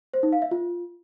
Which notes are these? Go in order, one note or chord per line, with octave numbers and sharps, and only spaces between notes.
C5
D#4
F5
E5
F4